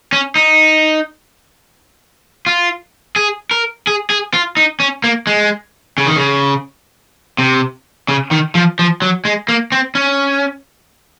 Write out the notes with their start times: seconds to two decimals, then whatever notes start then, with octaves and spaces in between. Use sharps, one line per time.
0.13 C#4
0.36 D#4
2.46 F4
3.16 G#4
3.51 A#4
3.87 G#4
4.10 G#4
4.34 F4
4.57 D#4
4.80 C#4
5.04 A#3
5.27 G#3
5.98 C#3
6.07 D#3
6.16 C#3
7.38 C3
8.09 C#3
8.31 D#3
8.55 F3
8.79 F3
9.02 F#3
9.25 G#3
9.49 A#3
9.72 C4
9.95 C#4